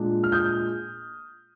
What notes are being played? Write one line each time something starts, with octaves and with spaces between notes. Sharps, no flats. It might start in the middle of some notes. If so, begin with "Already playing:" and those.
Already playing: A#2 G#3 D4
F6
D#6 G6